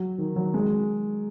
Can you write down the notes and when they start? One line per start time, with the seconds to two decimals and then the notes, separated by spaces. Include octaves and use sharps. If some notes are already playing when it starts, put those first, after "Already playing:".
Already playing: F#3
0.18 D#3
0.36 F#3
0.54 G#3